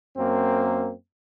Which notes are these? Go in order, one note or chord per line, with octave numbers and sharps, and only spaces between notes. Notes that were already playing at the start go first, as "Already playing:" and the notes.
F#2 A#3 C4